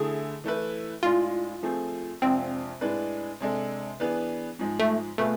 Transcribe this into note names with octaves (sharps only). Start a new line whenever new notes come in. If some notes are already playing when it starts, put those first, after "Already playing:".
Already playing: D3 A3 E4 G#4
E3 A3 E4 B4
A2 G#3 D4 F4
F3 A3 C4 G#4
F2 C3 G#3 C4 D4 F4
A2 G#3 D4 G#4 B4
C3 G#3 D4 A4
E3 B3 D4 G#4 B4
G#2 F3 G#3
A3
B2 A3 B3 F4 G#4 B4